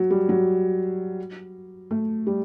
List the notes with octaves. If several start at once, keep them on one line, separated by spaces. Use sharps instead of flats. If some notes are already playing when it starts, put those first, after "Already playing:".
Already playing: F#3
G3
F#3
A3
G3